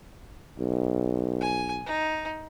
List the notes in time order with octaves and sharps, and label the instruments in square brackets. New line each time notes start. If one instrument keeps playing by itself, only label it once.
[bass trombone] B1
[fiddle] G#5
D#4